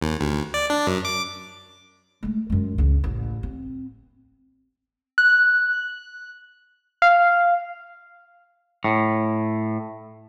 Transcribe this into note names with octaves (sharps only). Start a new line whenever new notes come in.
D#2
D2
D5
D4
F#2
D6
G#3 A3
F#2 G#3
C#2 D4
A1
C4
F#6
F5
A2